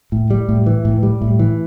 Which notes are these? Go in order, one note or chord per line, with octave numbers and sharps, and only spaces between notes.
A2
G3
A2
E3
A2
G3
A2
E3